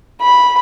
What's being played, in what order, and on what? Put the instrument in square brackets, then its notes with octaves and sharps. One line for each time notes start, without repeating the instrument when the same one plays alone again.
[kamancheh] B5